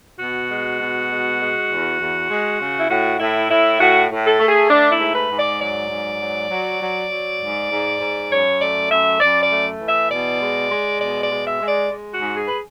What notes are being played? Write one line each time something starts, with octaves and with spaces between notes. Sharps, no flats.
B2 F#4
G#3
B2
G#3
G#3
E2
E2
G#3
C#3
E4
A2 F#4
A2 E4
A2 E4
A2 F#4
A2
A4
A3
G#4
A3 D4
E4
G#2
B4
G#2
D5
F#3 D5
G#2
F#3
F#3
F#3
F#3
G#2
G#2
G#2
F#2 C#5
A3 D5
F#2 E5
F#2 D5
D5
A3
E3
E5
B2 D5
G#3
G#3
B2 D5
D5
G#3
E5
G#3
D5
G#3
F#4
G#2
G#4
B4